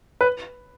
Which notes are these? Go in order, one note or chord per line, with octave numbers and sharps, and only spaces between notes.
B4